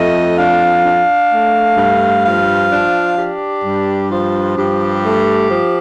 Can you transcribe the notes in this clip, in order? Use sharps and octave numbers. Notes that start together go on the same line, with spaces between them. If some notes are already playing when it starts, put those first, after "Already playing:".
Already playing: F2 A3 D#5
D4 F5
D4
A3
G2
F3 F5
D4
D4 G4
G2
F3 F4
G2 G4
A3
F3